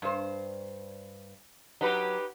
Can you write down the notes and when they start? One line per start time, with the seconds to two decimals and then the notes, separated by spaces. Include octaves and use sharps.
0.02 G2 C5
1.81 F#3 D#4 G4 B4